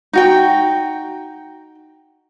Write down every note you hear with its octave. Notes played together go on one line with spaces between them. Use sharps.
D#4 F#4 G5